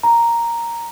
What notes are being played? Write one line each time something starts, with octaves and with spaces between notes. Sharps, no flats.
A#5